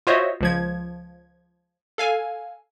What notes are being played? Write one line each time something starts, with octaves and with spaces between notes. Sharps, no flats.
F4 F#4 C5 C#5 D#5 E5
C#2 F3 G#6
A4 F5 G#5